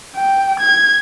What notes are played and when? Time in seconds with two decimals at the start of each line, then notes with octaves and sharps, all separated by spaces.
0.16 G5
0.60 G#6